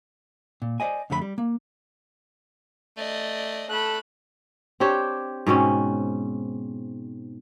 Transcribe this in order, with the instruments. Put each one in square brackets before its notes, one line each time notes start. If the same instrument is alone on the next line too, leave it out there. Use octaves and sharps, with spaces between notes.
[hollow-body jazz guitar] A#2
C5 D5 D#5 G#5
F2 D3 A3 A4 B5
G3
A#3
[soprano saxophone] A3 [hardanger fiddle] D5 D#5
[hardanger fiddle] A3 B5 [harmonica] A4 [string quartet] F#6
[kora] C4 D4 G4 C#5
G#2 B2 C4 C#4